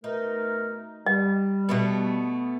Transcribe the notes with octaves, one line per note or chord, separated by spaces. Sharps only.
B2 A3 D#4 A#4
G3 D#5
B2 A3 B3